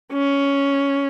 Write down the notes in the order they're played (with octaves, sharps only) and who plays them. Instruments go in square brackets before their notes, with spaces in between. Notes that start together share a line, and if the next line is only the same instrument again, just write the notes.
[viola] C#4